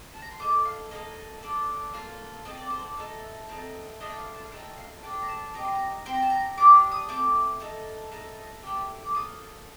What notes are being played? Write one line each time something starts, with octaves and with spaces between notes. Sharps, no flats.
A5
A#5
C6
A3 D#4 A4 D6
F5
A#3 D#4 A4 D#5
D4 A4
A#3 F4 A4
C4 F4 A4 D#5
D5
C5
D5
A3 D#4 A4
A3 C4 D#4 A4
A3 D4 F4 A4 D#5
G5
F5
A5
F5
A3 D#4 A4 G5
F5
D4 A4 G5
A#5
A5
C4 D#4 G4 A#5
C6
A#5
C4 G4 C6
A#5
A5
A#5
D4 G4 D6
F6
D#6
A3 C4 D6
A3 D#4 A4
A3 D#4 A4
A3 C4 G4
D6
A#3 F4 A4 D#6